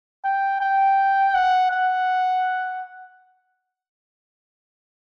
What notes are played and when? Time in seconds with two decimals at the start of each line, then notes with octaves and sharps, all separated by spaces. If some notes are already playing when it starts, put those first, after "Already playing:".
0.24 G5
0.61 G5
1.34 F#5
1.71 F#5